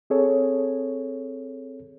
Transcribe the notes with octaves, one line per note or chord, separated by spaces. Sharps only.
C4 G#4 A4 C#5